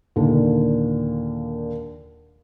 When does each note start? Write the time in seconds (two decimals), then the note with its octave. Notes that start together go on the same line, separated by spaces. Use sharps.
0.16 D#2 A#2 D3